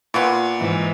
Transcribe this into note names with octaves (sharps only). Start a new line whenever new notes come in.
A#2 B3 F4 C#6
G#2 E3